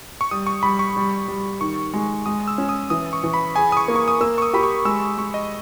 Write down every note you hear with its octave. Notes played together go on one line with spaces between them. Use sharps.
C#6
G3 D#6
C#6
G3 B5
C#6
G3
G3
D#3 C#6
G#3
G#3 D#6
E6
C#4
D#6
E3 D#6
C#6
E3
B5
G#4 G#5
D#6
C#6
A#3
C#6
D#6
A#3 E6
C#6
D#6
G4 B5
C#6
G#3 E6
G#3 C#6
D#5